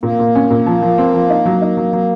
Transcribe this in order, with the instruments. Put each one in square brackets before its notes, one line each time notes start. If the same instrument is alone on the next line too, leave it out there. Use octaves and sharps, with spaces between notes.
[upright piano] A#2 [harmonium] A#3
[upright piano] A#2
C#4
A#2
F3
F3
C4
F3
D#4
F#3
D#4
F#3
F#3